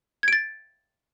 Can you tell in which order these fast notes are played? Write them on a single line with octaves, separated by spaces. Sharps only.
G#6 D7 A6